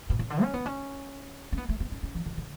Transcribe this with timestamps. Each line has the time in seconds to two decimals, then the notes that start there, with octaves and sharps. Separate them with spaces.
0.10 B2
0.19 C#3
0.30 D3
0.42 C#4
0.53 B3
0.66 C#4
1.52 C#4
1.57 B3
1.69 A3
1.80 B3
1.92 C#4
2.03 C#4
2.15 E3
2.26 D3
2.37 D3